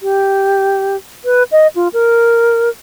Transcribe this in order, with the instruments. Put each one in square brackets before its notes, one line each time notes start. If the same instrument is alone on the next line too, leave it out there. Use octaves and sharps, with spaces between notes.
[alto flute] G4
B4
D#5
F4
A#4